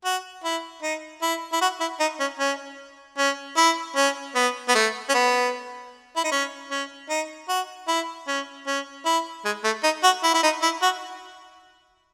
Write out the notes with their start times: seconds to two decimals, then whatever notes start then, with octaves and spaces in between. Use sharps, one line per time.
0.05 F#4
0.44 E4
0.83 D#4
1.22 E4
1.53 E4
1.61 F#4
1.80 E4
2.00 D#4
2.20 C#4
2.39 C#4
3.18 C#4
3.57 E4
3.96 C#4
4.35 B3
4.68 B3
4.75 A3
5.09 C#4
5.14 B3
6.16 E4
6.24 D#4
6.31 C#4
6.71 C#4
7.09 D#4
7.49 F#4
7.88 E4
8.28 C#4
8.67 C#4
9.06 E4
9.45 G#3
9.64 A3
9.83 D#4
10.04 F#4
10.23 E4
10.34 E4
10.43 D#4
10.62 E4
10.82 F#4